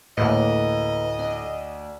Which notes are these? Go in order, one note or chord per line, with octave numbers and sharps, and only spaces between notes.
D2 A2 A#3 B4 D#5
D4